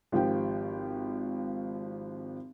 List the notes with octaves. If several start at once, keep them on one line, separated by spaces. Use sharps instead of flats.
G#1 F3 G4 G5